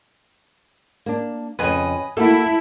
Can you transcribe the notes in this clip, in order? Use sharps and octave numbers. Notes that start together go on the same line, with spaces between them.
A#3 D4
F2 C#3 B4 D#5 G#5
A3 A#3 E4 F#4 A4